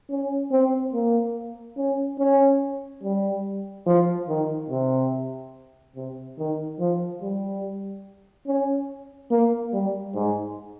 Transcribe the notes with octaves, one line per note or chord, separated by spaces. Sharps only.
C#4
C4
A#3
C#4
C#4
G3
F3
D#3
C3
C3
D#3
F3
G3
C#4
A#3
G3
G#2